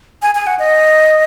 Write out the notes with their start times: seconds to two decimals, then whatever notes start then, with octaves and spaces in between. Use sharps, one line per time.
0.22 G#5
0.35 G#5
0.47 F#5
0.59 D#5